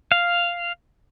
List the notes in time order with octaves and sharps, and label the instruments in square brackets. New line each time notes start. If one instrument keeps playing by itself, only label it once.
[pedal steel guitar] F5